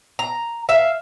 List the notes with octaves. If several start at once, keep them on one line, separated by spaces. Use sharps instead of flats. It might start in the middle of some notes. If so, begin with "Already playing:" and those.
A#5
E5 F5